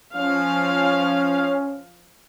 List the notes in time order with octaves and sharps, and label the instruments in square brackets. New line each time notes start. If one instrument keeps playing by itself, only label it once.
[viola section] F3 F5 [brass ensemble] C#4